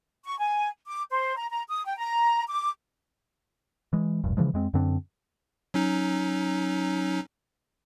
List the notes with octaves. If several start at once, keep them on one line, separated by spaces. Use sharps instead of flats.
C#6
G#5
D6
C5
A#5
A#5
D#6
G5
A#5
D6
E3 G#3
E1 A#1 G2
C#3 E3 F3 G#3
F2 G#3 C4
F#2 D3 C4 D4
F#3 C#4 D#4